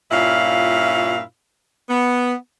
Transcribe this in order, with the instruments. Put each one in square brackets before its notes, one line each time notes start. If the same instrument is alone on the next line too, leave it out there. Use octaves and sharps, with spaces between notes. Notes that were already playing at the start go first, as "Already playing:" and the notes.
[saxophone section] G2 A#2 C#4 E4 F4 F5
B3